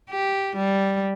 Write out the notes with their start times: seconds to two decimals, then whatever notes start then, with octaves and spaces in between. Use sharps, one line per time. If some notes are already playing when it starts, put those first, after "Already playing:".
0.10 G4
0.56 G3